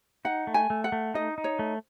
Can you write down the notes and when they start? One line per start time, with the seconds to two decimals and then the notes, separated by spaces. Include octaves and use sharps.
0.25 D#4 F#5
0.47 A3
0.54 G#5
0.70 A3
0.84 F#5
0.92 A3
1.14 D#4 D#5
1.38 D#4
1.44 C#5
1.59 A3